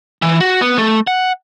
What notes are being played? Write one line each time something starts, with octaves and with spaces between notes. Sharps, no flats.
E3
F#4
B3
A3
F#5